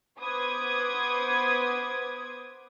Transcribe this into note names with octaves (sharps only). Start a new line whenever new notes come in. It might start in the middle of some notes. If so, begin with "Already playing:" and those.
B3 B4 C5 D6 D#6 G#6